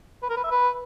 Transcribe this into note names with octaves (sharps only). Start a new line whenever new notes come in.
B4
A#4
B4
E5
B4